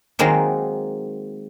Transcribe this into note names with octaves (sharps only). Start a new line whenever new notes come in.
D#3 F#3 G#3 A#3 C4